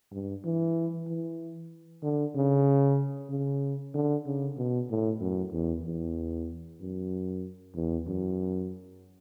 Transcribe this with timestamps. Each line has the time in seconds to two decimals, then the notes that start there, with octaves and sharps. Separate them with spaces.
0.12 G2
0.44 E3
1.08 E3
2.02 D3
2.35 C#3
3.30 C#3
3.94 D3
4.26 C#3
4.57 B2
4.90 A2
5.20 F#2
5.52 E2
5.85 E2
6.81 F#2
7.75 E2
8.07 F#2